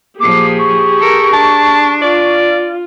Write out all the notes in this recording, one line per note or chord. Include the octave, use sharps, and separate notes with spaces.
A#2 F3 G4 G#4 D6
C#6
A4 A#4
D4 A5
F4 D5